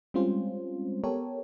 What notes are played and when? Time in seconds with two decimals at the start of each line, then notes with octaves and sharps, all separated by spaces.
0.14 G3 G#3 C4 C#4 F4 C5
1.04 B3 G4 A4 A#4 C#5